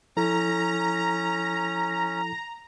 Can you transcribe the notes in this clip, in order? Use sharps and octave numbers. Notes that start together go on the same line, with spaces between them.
F3 C#4 E4 A4 A#5